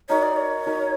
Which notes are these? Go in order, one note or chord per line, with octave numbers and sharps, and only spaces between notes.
D#4 F#4 A#4 C#5
D5
C#5
D#4 F#4 A#4